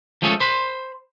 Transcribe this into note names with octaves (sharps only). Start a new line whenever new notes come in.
F3 G#3 A3 C#4 G#4 A4
C5 B5